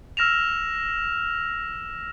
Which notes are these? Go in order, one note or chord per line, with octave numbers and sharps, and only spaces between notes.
E6 F6 A#6 E7 F7